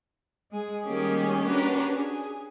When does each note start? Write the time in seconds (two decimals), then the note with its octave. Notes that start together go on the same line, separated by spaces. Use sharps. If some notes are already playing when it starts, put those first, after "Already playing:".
0.51 G#3 G#4
0.84 D#3 G3 A#3 C#4 G4 G#4
1.44 C#4 D4 F#4 G4 A#4 B4
1.95 G#4